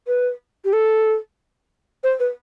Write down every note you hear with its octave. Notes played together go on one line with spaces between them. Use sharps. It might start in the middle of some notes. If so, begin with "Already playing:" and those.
B4
G4
A4
C5
B4